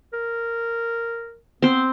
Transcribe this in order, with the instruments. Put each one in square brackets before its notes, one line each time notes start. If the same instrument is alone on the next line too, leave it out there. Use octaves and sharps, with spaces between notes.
[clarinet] A#4
[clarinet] B3 [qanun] C4 C5